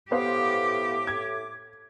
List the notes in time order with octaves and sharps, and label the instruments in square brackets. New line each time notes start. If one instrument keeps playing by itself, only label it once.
[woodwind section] A2 D6 [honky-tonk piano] B3 C5 F5 [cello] G4
[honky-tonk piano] G#6